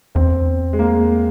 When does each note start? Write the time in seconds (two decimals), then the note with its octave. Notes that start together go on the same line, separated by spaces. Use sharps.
0.15 E2 C4
0.73 G#3
0.79 A#3